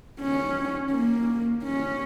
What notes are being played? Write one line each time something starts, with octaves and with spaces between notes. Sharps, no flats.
C#4
A#3
C#4